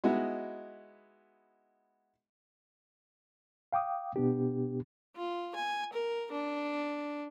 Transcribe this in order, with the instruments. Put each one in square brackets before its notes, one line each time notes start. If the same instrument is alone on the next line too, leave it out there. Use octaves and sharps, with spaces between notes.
[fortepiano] G#3 B3 D#4 E4 F#4
[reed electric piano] F5 G5 D6 D#6
B2 B3 D4 G4
[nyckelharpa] F4
G#5
A#4
D4